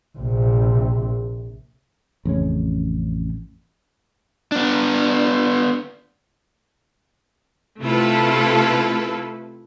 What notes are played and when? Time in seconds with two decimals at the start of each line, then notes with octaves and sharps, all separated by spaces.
0.18 A#1 C3
2.25 A1 F2 C#3 C#4
4.52 B3 D4
7.81 C3 A3 E4 F4 A4 B4